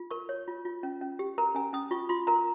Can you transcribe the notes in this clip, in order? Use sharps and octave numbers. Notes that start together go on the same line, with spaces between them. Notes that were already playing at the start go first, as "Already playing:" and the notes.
Already playing: F4
A#4 C#6
C#5
F4
F4
C#4
C#4
G4
A#4 A#5
C#4 G#5
C#4 D#6
F4 C#6
F4 C6
A#4 A#5